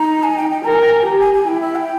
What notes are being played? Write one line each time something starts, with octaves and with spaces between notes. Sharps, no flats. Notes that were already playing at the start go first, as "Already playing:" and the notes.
Already playing: D#4 A#5
G#5
G5
G5
A#4 A#5
G#5
G5
G#5
G4 A#5
G#5
G#5
E4 G5
E5
G5